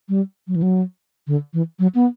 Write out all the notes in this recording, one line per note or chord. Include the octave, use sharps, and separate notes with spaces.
G3
F#3
E3
F#3
D3
E3
F#3
B3